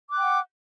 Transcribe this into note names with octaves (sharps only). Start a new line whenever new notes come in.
F#5 G5 D6 F#6